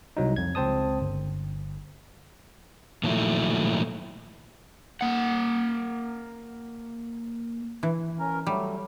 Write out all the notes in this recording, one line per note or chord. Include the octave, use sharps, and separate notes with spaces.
C2 F#3 D#4
F2 G#6
C#2 C4 C5 A5 D#6
G1
A#2 D#3 F3 F#3 A3 E4
A#3 F#5
E3
C#4 A#4
F#3 G3 A3